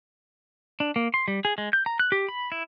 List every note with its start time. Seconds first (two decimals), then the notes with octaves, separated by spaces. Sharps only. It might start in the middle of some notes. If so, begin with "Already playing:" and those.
0.80 D4
0.96 A#3
1.14 C6
1.28 G3
1.45 G#4
1.58 G#3
1.73 G6
1.86 A#5
2.00 F#6
2.12 G4
2.29 B5
2.52 E4